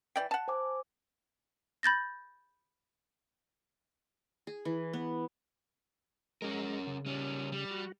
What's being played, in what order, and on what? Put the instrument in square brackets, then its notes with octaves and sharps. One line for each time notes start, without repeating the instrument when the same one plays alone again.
[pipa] E3 D5 G5
F#5 A5
[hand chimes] C5 G#5 D6
[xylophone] B5 G6 A6 A#6
[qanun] G#4
E3
B3
[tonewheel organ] G#3 A#5 [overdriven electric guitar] C#4 A#4
[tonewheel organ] C#3
[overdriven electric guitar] G3 C#4
G3
[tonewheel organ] F#4